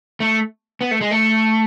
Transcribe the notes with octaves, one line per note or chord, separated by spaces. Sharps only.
A3
B3
A3
G#3
A3